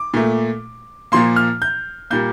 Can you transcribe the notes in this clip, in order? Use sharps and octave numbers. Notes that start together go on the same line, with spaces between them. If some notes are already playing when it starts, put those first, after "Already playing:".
Already playing: D6
A#2 A3
A#2 F3 A#3 C6
F6
G6
A#2 G3 A#3 G6